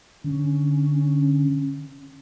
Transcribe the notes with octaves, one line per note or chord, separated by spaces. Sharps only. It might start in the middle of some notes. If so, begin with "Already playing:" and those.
D3 C#4